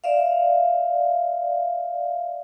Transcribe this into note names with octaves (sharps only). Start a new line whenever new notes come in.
D5 E5 F5